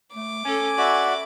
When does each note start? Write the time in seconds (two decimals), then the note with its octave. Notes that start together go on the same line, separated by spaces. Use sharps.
0.14 A3 D6
0.45 C#4 A4 G#5
0.78 F#4 D5 E5 B5